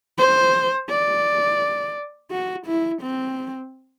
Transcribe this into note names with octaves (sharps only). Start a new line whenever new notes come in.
C5
D5
F#4
E4
C4